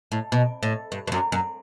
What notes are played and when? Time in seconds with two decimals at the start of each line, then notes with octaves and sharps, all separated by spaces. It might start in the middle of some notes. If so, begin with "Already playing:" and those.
0.12 A2
0.32 B2
0.63 A2
0.92 G2
1.07 G2
1.12 F#2
1.32 F#2